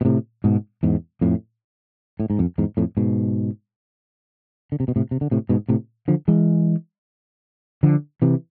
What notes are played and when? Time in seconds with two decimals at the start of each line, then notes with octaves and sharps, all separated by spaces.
0.01 B2
0.05 A2 C3
0.44 G#2 B2
0.83 E2 G#2
1.21 F2 A2
2.20 A2
2.30 G#2
2.39 F2
2.58 E2 G#2
2.77 F2 A2
2.97 G#2 B2
4.72 D3
4.80 C3
4.88 B2
4.96 A2 C3
5.11 C3
5.21 D3
5.31 A2 C3
5.49 G#2 B2
5.69 A2 C3
6.08 D3 F3
6.28 E3 G#3
7.83 D3 F3
8.22 C3 E3